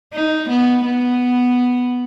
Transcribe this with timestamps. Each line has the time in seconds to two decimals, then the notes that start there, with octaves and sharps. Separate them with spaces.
0.13 D#4
0.50 B3
0.85 B3